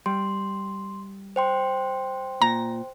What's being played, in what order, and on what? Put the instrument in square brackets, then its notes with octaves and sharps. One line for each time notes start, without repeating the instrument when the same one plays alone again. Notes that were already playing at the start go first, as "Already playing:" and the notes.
[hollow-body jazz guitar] G3 [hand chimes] C6
[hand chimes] C5 G5 C6
[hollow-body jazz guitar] A#2 [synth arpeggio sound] A#5